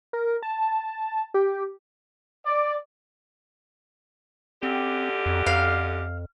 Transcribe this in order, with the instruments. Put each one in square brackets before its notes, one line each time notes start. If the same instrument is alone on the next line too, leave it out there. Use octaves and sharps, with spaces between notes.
[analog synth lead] A#4
A5
G4
[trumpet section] D5
[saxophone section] F#2 D3 G4 [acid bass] C4
[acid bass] F2
[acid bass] F2 [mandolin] F5